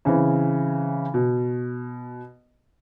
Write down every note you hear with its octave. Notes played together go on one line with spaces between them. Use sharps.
C#3 E3 C4
B2